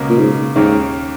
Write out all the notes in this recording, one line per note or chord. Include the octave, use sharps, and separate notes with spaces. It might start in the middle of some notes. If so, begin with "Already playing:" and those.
Already playing: C#2 B2 A#3 C#4
A#2
G#2
D#2 G#2 D#3 A#3 C#4